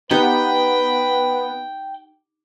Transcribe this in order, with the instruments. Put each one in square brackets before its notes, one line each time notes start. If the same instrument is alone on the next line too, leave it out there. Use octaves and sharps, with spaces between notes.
[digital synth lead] B3 [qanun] D#4 G4 [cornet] B4 [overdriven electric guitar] G5